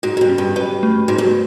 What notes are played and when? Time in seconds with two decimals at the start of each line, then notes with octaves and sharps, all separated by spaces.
0.03 G#2 F#4
0.17 G#2
0.21 G2
0.29 C#4
0.38 G2
0.56 G2 B4
0.83 A3
1.08 G#2 F#4
1.18 G2